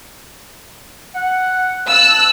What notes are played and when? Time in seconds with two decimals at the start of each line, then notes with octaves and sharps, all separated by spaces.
1.15 F#5
1.89 F5 A5 E6 F#6